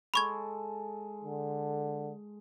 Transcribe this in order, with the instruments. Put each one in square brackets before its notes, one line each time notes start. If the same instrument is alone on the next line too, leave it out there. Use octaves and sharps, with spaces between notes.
[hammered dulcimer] G#3 A4 [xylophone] B5 C#6 G#6
[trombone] D3